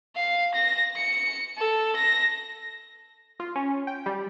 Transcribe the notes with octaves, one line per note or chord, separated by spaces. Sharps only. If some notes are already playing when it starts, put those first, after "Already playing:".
F5
A#6
C#7
A4
A#6
F4
C#4
G5
G3